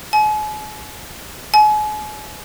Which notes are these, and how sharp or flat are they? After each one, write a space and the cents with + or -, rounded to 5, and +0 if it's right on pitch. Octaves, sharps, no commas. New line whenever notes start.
G#5 +45
G#5 +40